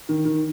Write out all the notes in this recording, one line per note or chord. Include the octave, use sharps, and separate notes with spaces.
D#3
D#3